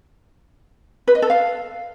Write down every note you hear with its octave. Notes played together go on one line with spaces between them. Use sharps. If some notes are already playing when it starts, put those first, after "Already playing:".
B4
D#5
A4
F5